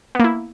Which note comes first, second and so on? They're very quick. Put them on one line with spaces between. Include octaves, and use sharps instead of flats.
B3 A#3 E4